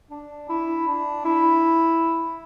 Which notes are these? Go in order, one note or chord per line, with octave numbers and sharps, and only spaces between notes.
D4
E4
D4
E4